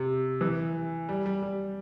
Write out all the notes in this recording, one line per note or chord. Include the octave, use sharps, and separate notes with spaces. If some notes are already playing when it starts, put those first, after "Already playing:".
Already playing: C3
E3
G3
G3
G3